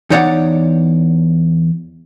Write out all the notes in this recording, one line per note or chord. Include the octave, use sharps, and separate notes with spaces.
E2 D#4 C#5 D5 E5 F#5